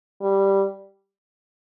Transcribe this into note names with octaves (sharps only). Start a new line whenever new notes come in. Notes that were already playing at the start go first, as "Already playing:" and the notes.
G3